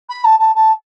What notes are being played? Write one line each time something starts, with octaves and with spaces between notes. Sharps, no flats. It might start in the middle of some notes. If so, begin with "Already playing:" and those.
B5
A5
A5
A5